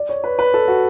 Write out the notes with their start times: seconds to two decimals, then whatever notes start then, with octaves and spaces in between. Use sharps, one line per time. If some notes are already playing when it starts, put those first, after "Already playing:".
Already playing: D5
0.09 C#5
0.24 B4
0.39 B4
0.54 A4
0.68 F#4